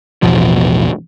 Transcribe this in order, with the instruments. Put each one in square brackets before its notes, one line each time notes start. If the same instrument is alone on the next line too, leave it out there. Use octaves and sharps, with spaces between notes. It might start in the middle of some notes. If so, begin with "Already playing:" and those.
[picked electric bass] A1 E2 B2 F3